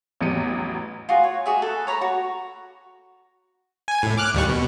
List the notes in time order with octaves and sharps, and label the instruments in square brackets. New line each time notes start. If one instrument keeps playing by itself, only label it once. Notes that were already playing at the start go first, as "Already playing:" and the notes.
[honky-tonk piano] A1 E2 F#3 G3 C#7 D#7
[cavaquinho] F4 F#4 G#4
C#5
F#4 G#4 E5
A4 B4
C#5 A#5 B5
F#4
[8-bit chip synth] G#5
A2
D6 F6 F#6
D#2 G3 C#6
B2